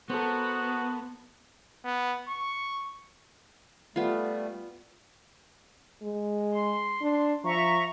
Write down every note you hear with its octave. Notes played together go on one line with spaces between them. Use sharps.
B3 F#4 A4 A#4 C5
B3
C#6
G3 A3 B3 F4
G#3
C6
D4
F3 E5 A#5 C#6